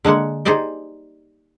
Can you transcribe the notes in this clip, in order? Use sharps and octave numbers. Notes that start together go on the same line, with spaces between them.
D3 G#3 A#3 F#5
D#4 G4 G#4 C5 D5 D#5